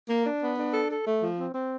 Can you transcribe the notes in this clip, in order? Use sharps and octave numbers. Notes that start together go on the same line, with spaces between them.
A#3
D4
B3
D4
A4
A4
A3
F3
C4
C4